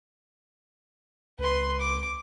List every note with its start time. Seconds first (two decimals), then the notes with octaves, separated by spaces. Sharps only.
1.39 C#2 B4 C6
1.80 D6